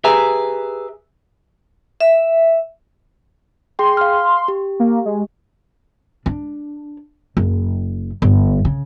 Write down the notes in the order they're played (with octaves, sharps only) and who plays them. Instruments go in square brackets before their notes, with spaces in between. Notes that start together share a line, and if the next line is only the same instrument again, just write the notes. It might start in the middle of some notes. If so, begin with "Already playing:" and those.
[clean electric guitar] G4 G#4 B4 E5 G#5 A#5
[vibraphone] E5
[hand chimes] G#4 G5 [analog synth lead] C6
[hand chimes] F5 F6
G4
[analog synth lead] A#3
G#3
[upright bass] D4
F#1
G1
C#3